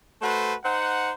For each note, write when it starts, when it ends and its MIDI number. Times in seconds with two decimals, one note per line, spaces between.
0.22 0.54 57
0.22 0.54 66
0.22 0.54 69
0.22 0.54 71
0.22 0.54 72
0.64 1.11 63
0.64 1.11 72
0.64 1.11 78